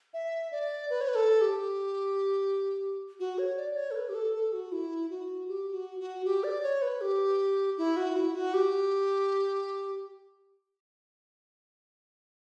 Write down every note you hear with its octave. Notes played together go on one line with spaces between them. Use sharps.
E5
D5
B4
C#5
B4
A4
G4
F#4
C#5
D5
C#5
A4
B4
G4
A4
A4
F#4
E4
F#4
G4
F#4
F#4
G4
D5
C#5
B4
G4
E4
F#4
E4
F#4
G4